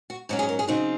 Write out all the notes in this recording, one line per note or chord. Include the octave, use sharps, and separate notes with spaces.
F#4
G#2 F#3 C#4 F#4
G#4
A#4
G#4
C#3 F#3 C4 D#4 F#4